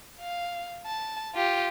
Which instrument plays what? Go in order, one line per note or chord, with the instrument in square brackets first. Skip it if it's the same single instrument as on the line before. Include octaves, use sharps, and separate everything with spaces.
[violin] F5
A5
F4 G4